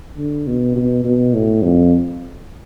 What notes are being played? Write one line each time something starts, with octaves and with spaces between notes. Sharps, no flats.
D3
B2
B2
B2
A2
F2